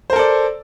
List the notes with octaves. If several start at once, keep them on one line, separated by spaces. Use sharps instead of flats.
A4 A#4 C5 D5